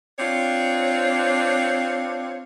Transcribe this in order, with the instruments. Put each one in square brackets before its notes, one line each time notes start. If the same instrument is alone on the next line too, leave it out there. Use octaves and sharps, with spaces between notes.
[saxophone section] C4 D4 F4 C#5